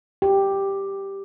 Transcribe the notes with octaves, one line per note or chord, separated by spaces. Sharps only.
G4